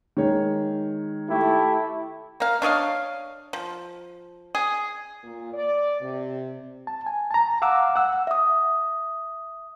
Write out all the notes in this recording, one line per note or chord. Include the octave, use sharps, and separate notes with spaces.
D#3 G#3 C#5
A3 E4 G4
A#3 F5
D4 C#5 D#5 F5
F3
G#4
A#2
D5
C3
A5
G#5
A5 A#5
F5 F#5 D6 E6
F#5 E6
E5 D#6